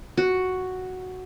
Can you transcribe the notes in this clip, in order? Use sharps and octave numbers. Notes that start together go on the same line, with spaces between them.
F#4